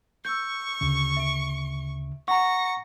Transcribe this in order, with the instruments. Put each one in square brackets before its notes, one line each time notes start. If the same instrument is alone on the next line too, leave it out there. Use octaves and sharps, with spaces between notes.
[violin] C#6 [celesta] E6 G6
[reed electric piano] D2 C#3
[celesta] E5 D7
[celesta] F#5 [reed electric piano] A#5 C#6 [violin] A#6 C#7